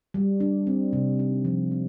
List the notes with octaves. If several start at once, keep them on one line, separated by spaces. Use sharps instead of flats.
G3
D4
C4
C3
D#4
F3
C4